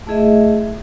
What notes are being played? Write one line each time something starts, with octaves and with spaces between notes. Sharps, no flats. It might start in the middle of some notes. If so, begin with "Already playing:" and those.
A3 E4 G#4 D#5 E5